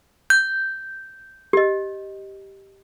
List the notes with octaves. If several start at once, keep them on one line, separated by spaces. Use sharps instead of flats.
G6
G4 D#5